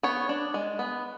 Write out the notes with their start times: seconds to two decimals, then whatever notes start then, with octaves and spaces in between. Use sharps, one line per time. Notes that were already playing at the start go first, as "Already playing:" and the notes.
0.03 B3 C#5
0.29 D4
0.54 G#3
0.79 B3